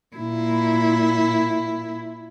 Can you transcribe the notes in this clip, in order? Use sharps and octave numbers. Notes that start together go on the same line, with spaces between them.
A#2 E4